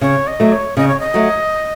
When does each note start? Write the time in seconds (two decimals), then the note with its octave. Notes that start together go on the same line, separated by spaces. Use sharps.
0.01 C#3 C#5
0.27 D#5
0.40 F#3 A3
0.52 C#5
0.77 C#3 D#5
0.88 C#5
1.00 D#5
1.14 F#3 A3